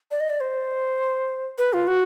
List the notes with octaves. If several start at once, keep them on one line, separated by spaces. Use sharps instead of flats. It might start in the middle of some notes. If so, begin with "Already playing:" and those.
D5
D#5
D5
C5
B4
F4
F#4